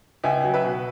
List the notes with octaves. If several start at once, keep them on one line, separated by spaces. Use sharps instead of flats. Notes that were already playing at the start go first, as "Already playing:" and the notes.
C#2 E5 G#5
F#3
B4 E5
B2